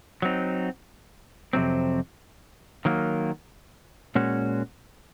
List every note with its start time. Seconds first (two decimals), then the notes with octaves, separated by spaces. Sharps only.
0.22 F#3 C4 D#4
1.53 F2 C3 F#3 C4
2.85 D#3 F#3 A#3
4.15 A#2 G#3 C#4 F#4